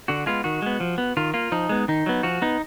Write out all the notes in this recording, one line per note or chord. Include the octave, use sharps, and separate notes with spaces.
D3 F#4
G#3 B3 F4
D#3 F#4
G#3 B3
F3
B3
D#3 F4
A#3 F4
F3 D#4
G#3 B3
D#3 D#4
F#3 B3
F3 F#4
B3 D#4